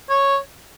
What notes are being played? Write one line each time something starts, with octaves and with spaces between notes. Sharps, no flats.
C#5